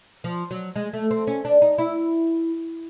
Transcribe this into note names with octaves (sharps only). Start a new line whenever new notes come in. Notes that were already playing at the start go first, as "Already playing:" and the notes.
F3
F#3
G#3
A3
C4
C#4
D4
D#4
E4